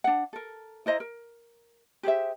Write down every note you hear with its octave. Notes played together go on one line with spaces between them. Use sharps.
D4 F#5
A4 A#4
E4 C5 D#5 A#5
A#4
G4 G#4 C5 E5